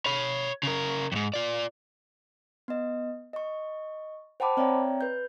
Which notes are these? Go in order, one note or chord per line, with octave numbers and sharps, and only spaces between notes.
C#5 B5
C#3 A#4
F2 G#2
F4 D5
B3 D#5
D#5 C#6
C5 F#5 G5 A5 B5 D6
C4 C#5 D5 E5 G5 A#5
B4 G6